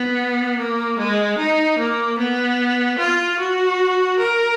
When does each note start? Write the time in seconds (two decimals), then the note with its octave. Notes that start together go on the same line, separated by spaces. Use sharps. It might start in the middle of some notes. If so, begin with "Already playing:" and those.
Already playing: B3
0.59 A#3
0.99 G#3
1.38 D#4
1.79 A#3
2.18 B3
2.99 F4
3.39 F#4
4.19 A#4